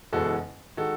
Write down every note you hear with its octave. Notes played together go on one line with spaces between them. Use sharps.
F#1 E2 B2 G#3 F#4 A4
D#3 G#3 F#4 A4